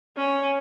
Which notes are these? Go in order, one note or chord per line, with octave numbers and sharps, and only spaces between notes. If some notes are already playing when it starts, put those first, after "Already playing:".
C#4